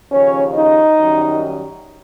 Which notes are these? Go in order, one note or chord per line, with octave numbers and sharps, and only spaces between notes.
D#2 C#3 F3 C#4 C#5
D#4 D#5
F#2 D#3 G3